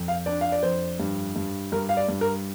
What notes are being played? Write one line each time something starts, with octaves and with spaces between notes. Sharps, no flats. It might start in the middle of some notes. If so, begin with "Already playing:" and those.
Already playing: F2
F5
D4 D5
F5
D5
F2 C5
G2
G2
G2 A#4
F5
D5
G2
A#4